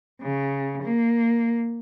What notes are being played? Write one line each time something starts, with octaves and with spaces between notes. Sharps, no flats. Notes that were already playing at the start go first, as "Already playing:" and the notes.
C#3
A#3